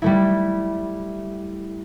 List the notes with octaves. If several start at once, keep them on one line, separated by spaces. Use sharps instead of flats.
G3 A3 E4